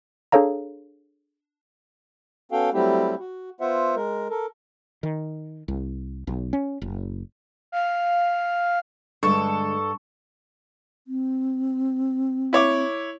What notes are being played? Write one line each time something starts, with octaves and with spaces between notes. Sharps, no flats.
D4 G#4 A4 C#5 F5 A#5
B3 C#4 F#4 A4 F5 G5
F#3 G3 A3 C4 E4 G4
F#4
B3 F4 C5 E5 F#5
G#3 A#4
A4 A#4
D#3
C2
B1
C#4
F#1
F5
G2 D3 G#3 A4 C#6
C4
E4 C#5 D6